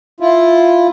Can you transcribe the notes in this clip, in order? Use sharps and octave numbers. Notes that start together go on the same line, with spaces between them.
E4 F4